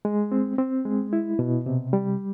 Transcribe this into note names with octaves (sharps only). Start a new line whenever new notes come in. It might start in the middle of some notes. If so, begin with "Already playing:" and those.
G#3
C4
C4
G#3
E4
B2
C3
G3